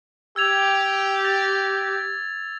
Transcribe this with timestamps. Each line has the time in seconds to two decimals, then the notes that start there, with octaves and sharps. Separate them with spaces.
0.36 G4 E6 G#6 F7
1.25 A6 F7